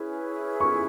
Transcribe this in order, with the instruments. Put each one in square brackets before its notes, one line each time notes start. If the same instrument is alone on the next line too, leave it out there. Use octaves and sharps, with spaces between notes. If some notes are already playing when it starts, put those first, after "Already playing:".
Already playing: [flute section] C#4 E4 G#4 B4
[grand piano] C#6